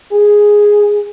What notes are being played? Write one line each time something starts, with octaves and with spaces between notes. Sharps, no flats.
G#4